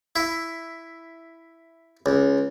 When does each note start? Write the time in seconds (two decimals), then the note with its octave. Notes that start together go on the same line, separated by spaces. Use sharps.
0.16 E4
2.06 C#2